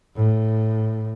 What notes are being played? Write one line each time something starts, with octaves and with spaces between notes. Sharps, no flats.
A2